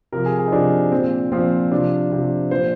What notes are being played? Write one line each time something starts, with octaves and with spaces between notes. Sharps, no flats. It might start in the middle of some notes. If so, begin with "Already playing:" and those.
C3 F3 A#4
G#4
G#4
D#4
C3 F3 D4
A#2 F3 C4
A#2 F3 C4
C3 F3 D4
C3 F3
A#2 F3 C5